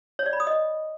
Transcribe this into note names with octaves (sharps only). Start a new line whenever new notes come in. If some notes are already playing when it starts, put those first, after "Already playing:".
C#5
D5
B5
D#6
D#5